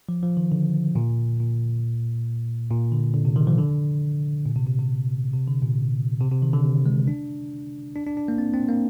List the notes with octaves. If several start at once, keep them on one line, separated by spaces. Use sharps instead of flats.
F3
F3
D#3
D3
A#2
A#2
A#2
D3
D3
C3
D#3
F3
D3
A#2
C3
C3
C3
C3
D3
A#2
C3
C3
D#3
D3
C3
G#3
D4
D4
D4
D4
A#3
C4
C4
A#3